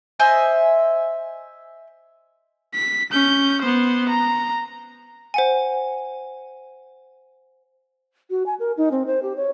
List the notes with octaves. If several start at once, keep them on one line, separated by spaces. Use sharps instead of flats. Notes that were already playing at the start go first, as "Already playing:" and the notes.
C5 D#5 E5 G#5
B6
C#4 G6
B3 C5
A#5
C5 F#5 G#5
F#4
G#5
A#4
D#4
C4
C5
G4
C#5